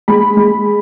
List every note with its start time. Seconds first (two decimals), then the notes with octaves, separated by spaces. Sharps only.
0.08 G#3 B5
0.37 G#3